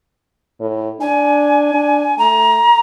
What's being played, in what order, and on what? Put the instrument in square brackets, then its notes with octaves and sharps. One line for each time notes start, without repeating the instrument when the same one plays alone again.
[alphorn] A2
[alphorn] D4 [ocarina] G#5
[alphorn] D4
[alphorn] A3 [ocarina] A#5